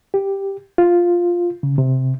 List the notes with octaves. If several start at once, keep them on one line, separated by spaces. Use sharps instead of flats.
G4
F4
C#3
C3